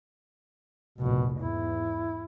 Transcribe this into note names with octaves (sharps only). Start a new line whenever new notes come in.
F1 A#1 B2
E2 G#2 E4